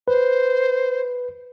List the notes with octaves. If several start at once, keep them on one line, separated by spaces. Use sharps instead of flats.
B4 C5